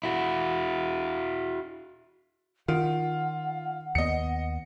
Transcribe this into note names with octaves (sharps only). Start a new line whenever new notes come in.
E4 F#4
D#3 F4 F#5
D#2 B3 D#5 C#7